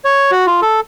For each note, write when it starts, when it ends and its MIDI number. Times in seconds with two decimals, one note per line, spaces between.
0.05 0.31 73
0.31 0.46 66
0.47 0.61 65
0.62 0.80 69